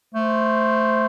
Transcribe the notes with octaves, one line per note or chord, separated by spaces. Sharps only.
A3 C5